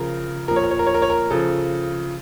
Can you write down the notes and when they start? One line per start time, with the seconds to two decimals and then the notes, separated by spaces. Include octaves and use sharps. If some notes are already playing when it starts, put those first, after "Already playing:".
Already playing: C#3 F3 A#4
0.48 A#2 F3 A#4
0.56 C#5
0.63 A#4
0.71 C#5
0.79 A#4
0.87 C#5
0.94 A#4
1.02 C#5
1.10 A#4
1.31 C#3 F3 A4